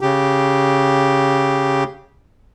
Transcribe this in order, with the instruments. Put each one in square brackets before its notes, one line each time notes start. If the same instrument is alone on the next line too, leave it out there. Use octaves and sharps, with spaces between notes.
[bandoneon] C#3 G4